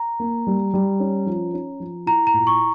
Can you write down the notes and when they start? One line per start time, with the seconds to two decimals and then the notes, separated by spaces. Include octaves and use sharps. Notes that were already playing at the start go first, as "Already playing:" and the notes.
Already playing: A#5
0.20 A#3
0.47 G3
0.74 G3
1.00 C#4
1.26 F3
1.54 C#4
1.80 F3
2.06 E4 A#5
2.27 A#5
2.34 A#2
2.47 C#6